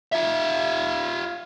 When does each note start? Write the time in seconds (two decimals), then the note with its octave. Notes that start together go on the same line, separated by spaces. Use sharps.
0.12 F4 E5